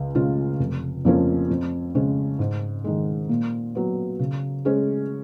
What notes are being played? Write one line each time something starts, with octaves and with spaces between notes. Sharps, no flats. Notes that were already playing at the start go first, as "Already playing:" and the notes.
Already playing: C#2
C#3 G#3 C#4 F4
F1
F2 F3 A#3 C#4
F2
C#3 G#3 C#4
G#2
D#3 G#3
A#2
F#3 B3
C#3
G#3 C#4 G#4